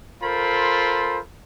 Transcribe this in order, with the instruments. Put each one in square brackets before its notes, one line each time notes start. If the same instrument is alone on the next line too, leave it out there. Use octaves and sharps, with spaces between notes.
[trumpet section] F4 A4 A#4 C5 B5